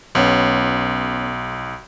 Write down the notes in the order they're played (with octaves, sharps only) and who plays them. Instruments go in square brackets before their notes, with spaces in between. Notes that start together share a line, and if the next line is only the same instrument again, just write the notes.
[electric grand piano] B1 [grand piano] B3 C#4